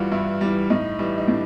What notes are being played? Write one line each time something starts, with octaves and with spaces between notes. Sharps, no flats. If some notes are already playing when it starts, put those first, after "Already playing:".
Already playing: G2 E3 G3 F4 F#4
G2 E4
E3 G3
A2 D#4
E3 G3
D#4
A2 D4